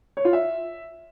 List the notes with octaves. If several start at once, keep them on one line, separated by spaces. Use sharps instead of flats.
C#5
F4
E5